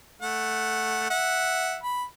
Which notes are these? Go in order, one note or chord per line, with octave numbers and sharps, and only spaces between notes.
A3 F#5
E5 F#5
B5